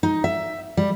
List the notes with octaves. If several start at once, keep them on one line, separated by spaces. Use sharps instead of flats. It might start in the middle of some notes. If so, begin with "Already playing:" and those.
D#4
E5
G3